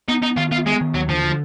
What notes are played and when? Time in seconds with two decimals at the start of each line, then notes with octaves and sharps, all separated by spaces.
0.08 B3 D#4
0.23 B3 D#4
0.37 D#3 F4
0.51 B3 F4
0.66 G#3 B3
0.81 D#3
0.94 D#2 F#3
1.09 D3 F3
1.24 D3